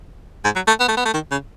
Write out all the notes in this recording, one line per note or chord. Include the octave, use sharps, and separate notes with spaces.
G#2
F#3
A3
B3
A3
B3
A3
D#3
C#3